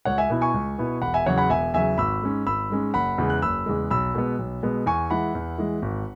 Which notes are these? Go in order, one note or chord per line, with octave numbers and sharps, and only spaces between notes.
C#2 C#5 F#5
E5 G#5
B2 B3 E4
G#5 C#6
C#2
B2 B3 E4
E1 F#5 B5
E5 G#5
E2 C#3 F#3 C#5 F#5
F#5 B5
E1 E5 G#5
E2 C#3 F#3 E5 G#5
G#1 B5 E6
G#2 G#3 C#4
G#1 B5 E6
G#2 G#3 C#4
F#1 F#5 B5
E2 C#3 G#3
F#6
F#1 B5 E6
E2 C#3 G#3
B1 B5 E6
B2 G#3 B3
B1
B2 G#3 B3
E2 G#5 C#6
E3 G#3 F#5 B5
E2
E3 G#3
G#1